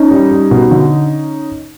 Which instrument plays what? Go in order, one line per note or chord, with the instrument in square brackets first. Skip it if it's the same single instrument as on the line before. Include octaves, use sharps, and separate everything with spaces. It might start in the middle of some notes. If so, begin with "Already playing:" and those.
Already playing: [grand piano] C#4 D#4
G3
G3
B2
D3